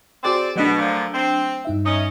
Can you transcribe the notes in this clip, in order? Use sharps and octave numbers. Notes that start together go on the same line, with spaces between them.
C4 F#4 G#4 D5 G5
B2 F#3 A3 D4
A#2 D3 F3
C4
G2 D#4 E5
C#4 D#5